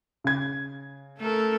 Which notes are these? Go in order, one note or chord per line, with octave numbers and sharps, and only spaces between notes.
C#3 G#6
A3 A4 A#4